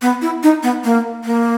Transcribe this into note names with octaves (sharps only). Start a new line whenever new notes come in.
B3
E4
D#4
B3
A#3
A#3